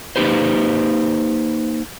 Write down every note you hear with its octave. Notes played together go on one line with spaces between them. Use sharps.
A#3 D#4 G4 B4 C5